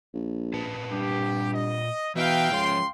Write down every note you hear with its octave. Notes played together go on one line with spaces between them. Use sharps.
A#1
A#2 B4 A5
G2 G4
D#5
B2 E3 D#4 B4 E5 F5 G5
C#2 F3 C#4 C#5 C6